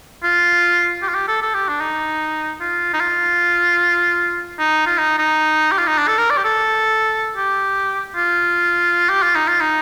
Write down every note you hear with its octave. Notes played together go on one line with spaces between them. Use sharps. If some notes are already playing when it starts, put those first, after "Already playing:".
F4
G4
F4
G4
A4
A4
G4
D4
D#4
F4
D#4
F4
D#4
F4
D#4
D#4
G4
F4
D#4
D4
A4
A#4
D5
G4
A4
G4
F4
G4
F4
D#4
F4
D#4